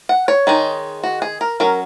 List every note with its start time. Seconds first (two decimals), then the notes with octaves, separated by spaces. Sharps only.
0.09 F#5
0.28 C#5
0.47 D#3 G#3 D#4
1.03 F#4
1.22 G#4
1.41 A#4
1.60 F#3 C#4 A#4